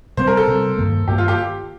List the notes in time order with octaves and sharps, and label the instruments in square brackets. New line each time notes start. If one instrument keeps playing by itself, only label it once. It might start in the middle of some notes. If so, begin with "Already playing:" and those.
[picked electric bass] C3 G3 C4 [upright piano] C5
[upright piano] A#4
A4
[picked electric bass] C3 G3 C4
G2 D#3 A#3
[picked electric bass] G2 D#3 A#3 [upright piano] G4
[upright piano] F4
G4